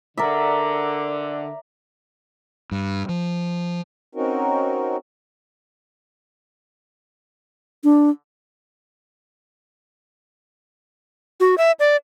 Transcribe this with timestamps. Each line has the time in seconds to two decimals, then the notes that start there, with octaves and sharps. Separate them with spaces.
0.17 D3 A#4 D5 E5
2.71 G2
3.09 F3
4.15 C4 C#4 D#4 F#4 A#4
7.84 D4
11.40 F#4
11.58 E5
11.80 D5